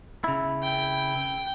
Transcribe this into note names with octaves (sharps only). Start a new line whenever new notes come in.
C#3 E4
G5